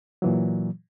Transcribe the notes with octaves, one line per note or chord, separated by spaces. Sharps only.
A#2 E3 F#3